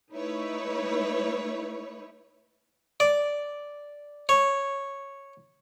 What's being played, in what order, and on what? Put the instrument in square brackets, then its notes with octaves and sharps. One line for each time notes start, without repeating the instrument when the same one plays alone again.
[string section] A3 D#4 E4 B4 C#5
[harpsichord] D5
C#5